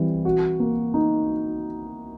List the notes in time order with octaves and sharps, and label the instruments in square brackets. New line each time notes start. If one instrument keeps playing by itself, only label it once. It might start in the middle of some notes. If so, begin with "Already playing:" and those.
Already playing: [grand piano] E3 G3 C4
F#4
A#3
D#4